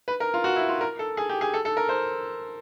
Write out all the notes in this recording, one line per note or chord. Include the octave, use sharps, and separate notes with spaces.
B4
A#4
F4
F#4
E4
F4
A#4
A4
G#4
G4
G#4
A4
A4
A#4
C5